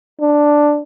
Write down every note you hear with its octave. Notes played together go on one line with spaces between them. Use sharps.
D4